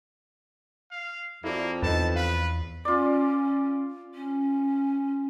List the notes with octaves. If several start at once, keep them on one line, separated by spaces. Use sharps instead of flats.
F5
F2 A#3 E4 F#4 D5
E2 D#4 A4 B4 A5
B4 F5
C#4 F4 D5
C#4